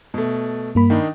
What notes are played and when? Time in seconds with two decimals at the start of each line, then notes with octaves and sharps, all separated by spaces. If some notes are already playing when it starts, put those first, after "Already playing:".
0.14 B2 A3
0.75 G2 A#3 B5
0.90 D#3 D4 D#4